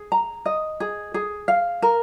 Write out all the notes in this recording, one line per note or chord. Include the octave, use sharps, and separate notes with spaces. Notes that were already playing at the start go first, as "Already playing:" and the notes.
Already playing: G#4
A#5
D#5
G#4
G#4
F5
A#4